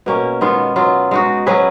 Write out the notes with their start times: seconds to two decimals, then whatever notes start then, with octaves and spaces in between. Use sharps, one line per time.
0.06 B2 A#3 C#4
0.41 D#3 G#3 B3 F4
0.76 F#3 B3 F4
1.11 G#3 D#4 F#4
1.46 F#3 C#4 G#4 B4